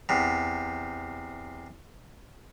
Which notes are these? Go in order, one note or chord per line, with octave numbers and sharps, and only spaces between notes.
E2 C3